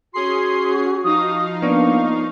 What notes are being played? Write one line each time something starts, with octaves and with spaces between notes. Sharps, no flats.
C#4 F#4 G#4 C6 C7
F3 D#4 F5 D#6
A#3 B3 D4 C#6